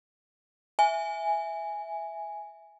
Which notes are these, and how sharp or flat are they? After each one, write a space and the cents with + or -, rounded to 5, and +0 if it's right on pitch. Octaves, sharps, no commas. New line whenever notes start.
E5 +0 G#5 +0